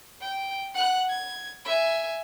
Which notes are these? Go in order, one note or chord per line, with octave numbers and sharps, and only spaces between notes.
G5
F#5 F#6
G#6
E5 G#5